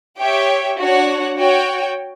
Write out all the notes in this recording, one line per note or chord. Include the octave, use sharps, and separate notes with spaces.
G4 C#5 E5 G5
D4 F#4 C#5 F#5
F#4 C#5 G5